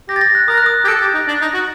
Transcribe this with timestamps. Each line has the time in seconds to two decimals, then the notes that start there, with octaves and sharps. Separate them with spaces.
0.09 G4 A#6
0.16 A6
0.21 A#6
0.35 F#6
0.48 A#4 D#6
0.58 F#6
0.66 D#6
0.84 G4
0.88 A4 D7
1.01 G4
1.14 D#4
1.28 D4
1.41 D#4
1.54 F#4